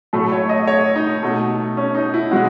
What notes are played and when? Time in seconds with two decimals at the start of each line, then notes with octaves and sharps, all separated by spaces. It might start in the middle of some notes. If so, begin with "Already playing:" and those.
0.13 A2 F#3 A3 A4
0.32 C#5
0.49 D#5
0.67 C#5
0.96 D#4
1.23 B2 A3
1.77 C#4
1.95 D#4
2.14 E4
2.31 B2 G#3 F#4